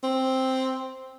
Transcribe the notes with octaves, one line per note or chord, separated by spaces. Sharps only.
C4